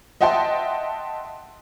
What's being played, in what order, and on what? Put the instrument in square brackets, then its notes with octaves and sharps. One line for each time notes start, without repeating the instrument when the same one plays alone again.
[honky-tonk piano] D#5 E5 F#5 G5 A5 C6